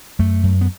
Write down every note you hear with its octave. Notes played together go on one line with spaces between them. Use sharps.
F#2 A3
F#2
B3